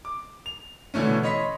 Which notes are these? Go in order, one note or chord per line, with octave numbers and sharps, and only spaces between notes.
D6
F7
B2 D3 E3 A3 C#4
C#5 D#5 B5 C6 B6